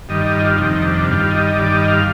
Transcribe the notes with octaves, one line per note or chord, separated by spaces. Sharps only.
G2 D#3 G3 D#5
D#5
F4
D4
F2 C3 D#3 G3 D#4
D4
G2 D#3 G3 F4
D#5
G2 D#3 G3 D5
D#5
F5